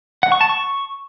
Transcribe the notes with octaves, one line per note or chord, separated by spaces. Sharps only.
F#5
C#6
A5
C#6